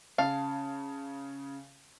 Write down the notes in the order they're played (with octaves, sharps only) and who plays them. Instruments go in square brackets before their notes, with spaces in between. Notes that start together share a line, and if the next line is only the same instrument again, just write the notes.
[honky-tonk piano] C#3 [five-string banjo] F5 [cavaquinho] A5